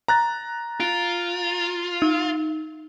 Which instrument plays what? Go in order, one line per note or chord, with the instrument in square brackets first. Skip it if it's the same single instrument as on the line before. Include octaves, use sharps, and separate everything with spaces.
[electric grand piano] A#5 F#6 A6
[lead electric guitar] F4 [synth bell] D7
[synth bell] D#4